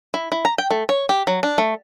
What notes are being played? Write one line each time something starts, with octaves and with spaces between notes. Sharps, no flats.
E4
E4
A#5
G5
A3
C#5
G4
F#3
D4
A3